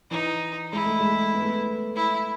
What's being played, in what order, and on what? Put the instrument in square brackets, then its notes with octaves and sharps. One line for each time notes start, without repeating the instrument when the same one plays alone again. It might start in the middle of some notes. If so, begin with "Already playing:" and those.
[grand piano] E3 [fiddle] D#4
[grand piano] G#3 [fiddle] E4
[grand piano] A3
G#3
B3
A3
B3
[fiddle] E4